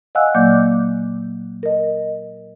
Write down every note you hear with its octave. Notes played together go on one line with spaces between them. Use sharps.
D#5 F5 F#5 G#5 E6 F#6
A#2 F#3 A#3 D5 D6 G6
A#4 D#5